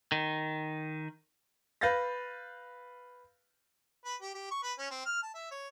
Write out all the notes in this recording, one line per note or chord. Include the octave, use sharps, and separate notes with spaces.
D#3
B4 F5 G6 A6 A#6
B4
G4
G4
C#6
B4
C#4
C4
F6
A5
E5
C#5